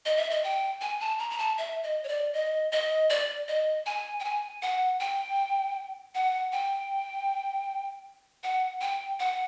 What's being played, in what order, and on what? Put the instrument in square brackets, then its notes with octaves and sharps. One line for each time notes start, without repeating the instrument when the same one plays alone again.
[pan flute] D#5
E5
D#5
G5
G#5
A5
A#5
A#5
A5
E5
D#5
C#5
D5
D#5
D#5
D5
D#5
G#5
G5
G#5
F#5
G5
F#5
G5
F#5
G5
F#5